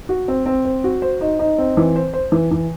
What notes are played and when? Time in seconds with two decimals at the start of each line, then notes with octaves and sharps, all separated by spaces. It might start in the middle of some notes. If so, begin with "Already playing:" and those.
0.09 F#4
0.28 C4
0.46 C4
0.65 C5
0.84 F#4
1.02 C5
1.21 D#4
1.39 D#4
1.58 C4
1.77 E3
1.96 C5
2.14 C5
2.32 E3
2.51 E3